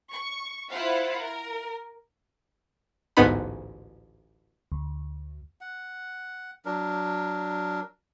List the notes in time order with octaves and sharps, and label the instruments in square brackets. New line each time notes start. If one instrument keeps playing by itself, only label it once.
[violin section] C#6
E4 F4 C5 F5 F#5
A#4
[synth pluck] A1 D2 G#2 B3 D#4 B5
[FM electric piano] D2
[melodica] F#5
F#3 D4 A#4